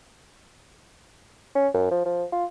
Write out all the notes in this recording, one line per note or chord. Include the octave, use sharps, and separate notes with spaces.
C#4
F#2
F3
F3
F4